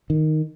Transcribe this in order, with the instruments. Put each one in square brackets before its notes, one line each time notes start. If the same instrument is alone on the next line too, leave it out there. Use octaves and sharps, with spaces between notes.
[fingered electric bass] D#3